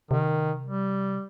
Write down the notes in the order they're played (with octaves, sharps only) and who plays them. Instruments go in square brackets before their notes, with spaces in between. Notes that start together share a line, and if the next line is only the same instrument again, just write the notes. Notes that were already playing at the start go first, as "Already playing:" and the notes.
[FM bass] C3 [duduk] D#3
[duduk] G3